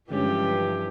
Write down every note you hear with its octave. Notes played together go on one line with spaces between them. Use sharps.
G2 D3 E3 F3 G#3 C#4 G4